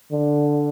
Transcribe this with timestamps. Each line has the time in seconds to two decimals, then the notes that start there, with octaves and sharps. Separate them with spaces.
0.12 D3